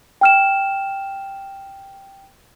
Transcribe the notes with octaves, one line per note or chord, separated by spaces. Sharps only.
G5 F6 E7